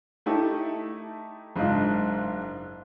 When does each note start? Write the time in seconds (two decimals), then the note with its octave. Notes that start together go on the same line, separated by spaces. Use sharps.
0.26 A3 D#4 E4 G4 A4
1.56 F#1 G#2 D4 F4 D#5